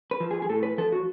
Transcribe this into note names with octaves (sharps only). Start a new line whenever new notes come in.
B4
F3
G#4
G#4
A2 A4
B4
F3 A4
F#4